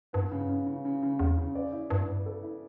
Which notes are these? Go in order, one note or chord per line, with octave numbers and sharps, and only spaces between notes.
G2 B3
C#3
C#3
C#3
C#3
C#3
E2 C#3
C#3
D5
E4
G2 B3
B3
A4
E4